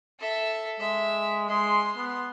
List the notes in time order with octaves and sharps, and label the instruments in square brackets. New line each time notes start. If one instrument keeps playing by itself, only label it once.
[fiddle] A4 E5
[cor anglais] G#3 [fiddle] E5
[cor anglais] G#3 [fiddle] C6
[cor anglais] B3